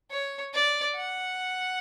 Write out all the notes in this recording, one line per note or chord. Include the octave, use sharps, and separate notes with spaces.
C#5
D5
F#5